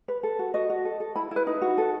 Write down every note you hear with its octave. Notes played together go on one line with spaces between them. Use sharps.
B4
A4
F#4
F#4 D#5
F#4
A4
A4
E4 B5
E4 B4
D#4
F#4
A4